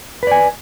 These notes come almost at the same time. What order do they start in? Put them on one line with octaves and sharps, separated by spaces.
B4 D5 G#5